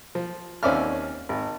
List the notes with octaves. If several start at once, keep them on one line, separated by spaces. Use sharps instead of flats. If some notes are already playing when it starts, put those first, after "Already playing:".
F3
D#2 C4 C#4 D5 E5 F6
G#1